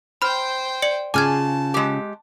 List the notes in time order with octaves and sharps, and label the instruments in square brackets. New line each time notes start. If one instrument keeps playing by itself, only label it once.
[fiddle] C5 G5 [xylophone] B5 F6
[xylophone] D5 C#7 F#7
[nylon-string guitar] C#3 F4 [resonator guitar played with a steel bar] G#5 [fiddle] A5 [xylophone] D6 F6 G#6
[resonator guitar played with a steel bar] G#3 G4